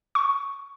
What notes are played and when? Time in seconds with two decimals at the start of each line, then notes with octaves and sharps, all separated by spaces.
0.15 C#6